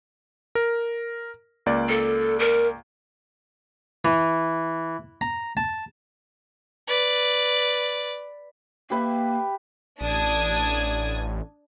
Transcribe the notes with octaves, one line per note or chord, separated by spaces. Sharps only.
A#4
C#2 A#3 D5
A4
A#4
E3
A#5
A5
B4 D5
A#3 G4 B4 E5
A1 D4 D#6 G#6